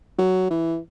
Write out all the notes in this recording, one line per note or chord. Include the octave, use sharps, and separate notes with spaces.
F#3
E3